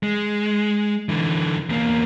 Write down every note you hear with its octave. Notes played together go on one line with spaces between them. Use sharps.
G#3
D3 E3
E2 A#3